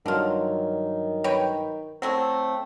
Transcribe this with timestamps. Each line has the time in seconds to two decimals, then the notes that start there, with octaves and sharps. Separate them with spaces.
0.06 G2 D3 D#3 F#3 F4
1.24 B4 C#5 G5
2.02 F#3 A3 C4 E4